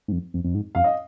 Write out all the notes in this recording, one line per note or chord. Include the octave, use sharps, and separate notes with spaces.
G#2
F2
F2
F2
G#2
F2 F5
D#5